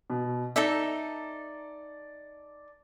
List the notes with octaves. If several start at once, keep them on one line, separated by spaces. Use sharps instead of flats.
B2
D#4 A4 D5 E5